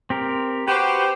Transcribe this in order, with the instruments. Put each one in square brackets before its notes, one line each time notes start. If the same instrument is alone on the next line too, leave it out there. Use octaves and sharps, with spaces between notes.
[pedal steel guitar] C4 G4 A#4
[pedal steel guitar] F#4 B4 [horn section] G4 C5